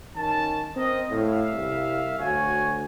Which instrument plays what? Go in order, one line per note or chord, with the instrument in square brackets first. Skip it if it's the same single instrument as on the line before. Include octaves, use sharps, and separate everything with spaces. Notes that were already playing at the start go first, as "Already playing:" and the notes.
[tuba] D#3 [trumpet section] C#4 A5
[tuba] C4 [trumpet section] A#4 D#5
[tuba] A2 [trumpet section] E5 F5
[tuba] C2
[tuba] D2 [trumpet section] F#4 C#5 G#5